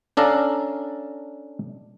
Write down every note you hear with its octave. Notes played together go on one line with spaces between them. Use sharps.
C#4 D4 A4 F5 A#5